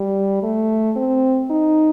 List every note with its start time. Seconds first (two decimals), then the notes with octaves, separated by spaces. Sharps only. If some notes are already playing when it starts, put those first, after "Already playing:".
Already playing: G3
0.43 A3
0.96 C4
1.50 D#4